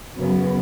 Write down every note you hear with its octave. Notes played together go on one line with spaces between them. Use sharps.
F#2 C#3 F#3 B3